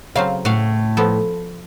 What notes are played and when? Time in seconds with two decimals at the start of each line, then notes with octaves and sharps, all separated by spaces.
0.16 C#3 F#3 C4 F5
0.45 A2 F#4 F5
0.97 F3 B3 A4